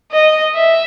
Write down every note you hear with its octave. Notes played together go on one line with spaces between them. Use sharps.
D#5
E5